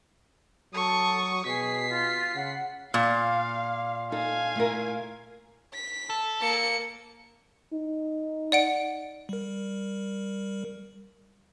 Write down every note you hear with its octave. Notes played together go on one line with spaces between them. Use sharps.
F#3 A4 C#6 D#6
B2 G#4 B6 C7
F4
C#3 F#5
A#2 F5
D#4 A4 F5 G#5
A3 E4 A#4
B6
A4
A#3 C#7
D#4
D5 F#5 D7
G3 A#4